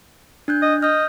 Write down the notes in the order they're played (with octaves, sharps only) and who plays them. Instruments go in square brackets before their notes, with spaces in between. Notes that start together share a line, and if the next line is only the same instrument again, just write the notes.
[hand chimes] D4 F#6 G6
[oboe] D#5
[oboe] D#5 [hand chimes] F6 G6